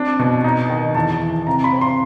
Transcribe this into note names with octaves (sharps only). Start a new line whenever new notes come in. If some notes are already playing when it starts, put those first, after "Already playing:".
Already playing: C4 D4
B2
D#4
D#3
E2 A5
E3
C3 A#5
B5
C4
C6